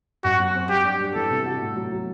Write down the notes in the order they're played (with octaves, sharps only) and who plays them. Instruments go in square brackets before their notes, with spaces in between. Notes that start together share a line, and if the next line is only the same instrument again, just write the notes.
[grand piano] F#2 [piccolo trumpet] F#4
[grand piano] F#3
C4
[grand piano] G3 [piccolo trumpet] G4
[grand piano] D4
G3
[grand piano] E3 [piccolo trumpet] A4
[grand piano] C3
F#4
A2
F#3
F#3